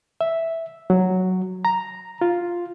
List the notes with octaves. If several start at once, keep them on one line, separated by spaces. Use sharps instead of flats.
E5
F#3
A#5
F4